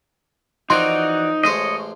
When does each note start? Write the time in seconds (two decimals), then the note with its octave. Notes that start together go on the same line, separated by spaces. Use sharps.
0.70 E3 F3 C4 D#4 F#4 A#4 D5 C6
1.44 A1 G#3 C5 C#5 D#5